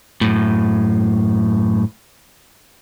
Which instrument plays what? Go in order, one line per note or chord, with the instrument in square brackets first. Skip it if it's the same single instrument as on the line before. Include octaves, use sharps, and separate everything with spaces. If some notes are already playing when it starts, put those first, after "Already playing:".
[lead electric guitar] F#2 A2